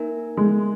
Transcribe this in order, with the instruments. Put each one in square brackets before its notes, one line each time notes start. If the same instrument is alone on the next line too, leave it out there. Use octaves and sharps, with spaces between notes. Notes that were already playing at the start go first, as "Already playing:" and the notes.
Already playing: [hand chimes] A#3 D#4 A#4 E5 G#5
[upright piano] G#3